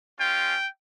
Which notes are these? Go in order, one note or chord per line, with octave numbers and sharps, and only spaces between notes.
G#3 C#4 F4 G5